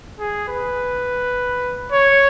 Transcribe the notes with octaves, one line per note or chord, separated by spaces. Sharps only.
G#4
B4
C#5